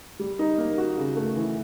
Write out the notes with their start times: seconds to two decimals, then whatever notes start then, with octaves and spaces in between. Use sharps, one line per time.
0.19 G3
0.39 D#4
0.58 A#3
0.78 F#4
0.97 C#3
1.16 A3
1.36 E3